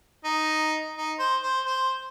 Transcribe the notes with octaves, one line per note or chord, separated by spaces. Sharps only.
D#4
D#4
C5
C5
C5